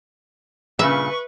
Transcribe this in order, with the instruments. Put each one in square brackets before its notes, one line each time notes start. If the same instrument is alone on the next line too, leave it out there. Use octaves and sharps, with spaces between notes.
[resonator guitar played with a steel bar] G2 A#2 C#3 [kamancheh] B4 C#6 [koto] E5